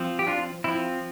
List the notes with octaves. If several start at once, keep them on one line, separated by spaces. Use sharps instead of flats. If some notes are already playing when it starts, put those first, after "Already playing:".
Already playing: F3 C4
G4
D4 F4
F3 C4 E4